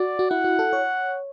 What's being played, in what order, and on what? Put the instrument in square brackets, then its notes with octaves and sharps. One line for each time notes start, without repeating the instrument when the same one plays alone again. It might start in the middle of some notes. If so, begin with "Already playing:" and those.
Already playing: [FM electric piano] F#4 [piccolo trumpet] D5
[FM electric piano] F#4
[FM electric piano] E4 [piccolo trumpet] F#5
[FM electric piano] F#4
A4
C#5